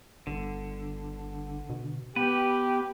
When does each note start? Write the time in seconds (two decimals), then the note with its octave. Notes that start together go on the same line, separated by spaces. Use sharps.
0.27 G1 D3
1.69 B2
2.16 B3 G4 B4